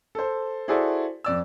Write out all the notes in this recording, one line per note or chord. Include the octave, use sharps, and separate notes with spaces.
A4 C5
E4 F#4 G#4 A4 C5 D5
F2 D5 E6